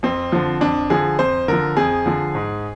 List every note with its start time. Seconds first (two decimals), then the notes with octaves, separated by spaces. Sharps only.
0.03 F2 C4
0.32 D3 F3
0.61 F2 D4
0.90 D3 F3 G#4
1.19 F2 C5
1.48 D3 F3 A#4
1.77 F2 G#4
2.06 D3 F3
2.35 G#2